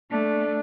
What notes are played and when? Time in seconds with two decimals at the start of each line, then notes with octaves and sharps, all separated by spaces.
0.11 A3 D4